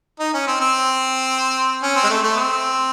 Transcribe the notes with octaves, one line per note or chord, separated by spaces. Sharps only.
D#4
C#4
C4
C4
C#4
C4
G#3
A3
A3
C4